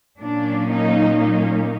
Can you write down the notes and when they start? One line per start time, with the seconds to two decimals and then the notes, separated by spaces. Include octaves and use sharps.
0.20 A#2 F#3 A#3 C#4 D4
0.70 D#4
1.20 D#4